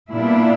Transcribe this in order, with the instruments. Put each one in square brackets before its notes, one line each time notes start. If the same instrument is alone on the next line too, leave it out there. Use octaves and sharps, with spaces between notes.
[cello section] A#2 G3 B3 D4 E4